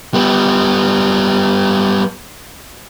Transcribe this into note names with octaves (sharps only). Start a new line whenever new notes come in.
G3 B3